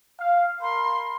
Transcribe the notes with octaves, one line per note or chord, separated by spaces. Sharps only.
F5
A#4 B5 C6